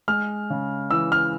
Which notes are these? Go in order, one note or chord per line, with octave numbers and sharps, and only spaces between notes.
G#3 F6
C#3
E3 E6
F6